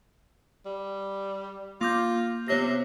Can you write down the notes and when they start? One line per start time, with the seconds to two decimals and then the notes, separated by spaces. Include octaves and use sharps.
0.66 G3
1.81 A#3 F4 D6 G6
2.48 C3 B3 C#5 A#6